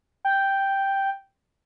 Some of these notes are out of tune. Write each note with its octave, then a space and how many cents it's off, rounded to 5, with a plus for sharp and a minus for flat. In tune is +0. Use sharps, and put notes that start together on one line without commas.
G5 +0